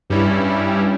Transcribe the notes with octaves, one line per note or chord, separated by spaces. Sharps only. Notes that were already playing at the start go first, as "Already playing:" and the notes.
G2 G3 C#4 E4